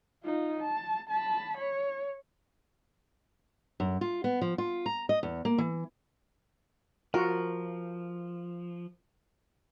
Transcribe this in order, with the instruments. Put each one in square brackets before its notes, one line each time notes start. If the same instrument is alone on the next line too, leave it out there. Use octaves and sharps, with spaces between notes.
[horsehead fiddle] D#4 F4
A5
A5 B5
C#5
[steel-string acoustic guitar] F#2
F4
B3
F3
F4
A#5
D#5
E2
A#3
E3
[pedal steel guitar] F3 [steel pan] F4 F#4 [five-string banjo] A#4